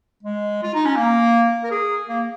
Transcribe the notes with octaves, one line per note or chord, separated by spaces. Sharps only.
G#3
F4
D#4
C#4
A#3
A#4
G#4
A#3